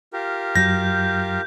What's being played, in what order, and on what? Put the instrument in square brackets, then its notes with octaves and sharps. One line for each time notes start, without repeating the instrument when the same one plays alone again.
[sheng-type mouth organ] F4 G4 A#4
[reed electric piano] F#2 F#3 [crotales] G6 [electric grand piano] A#6